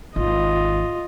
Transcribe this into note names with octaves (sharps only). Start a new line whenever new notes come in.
G#1 D#2 F4 D#5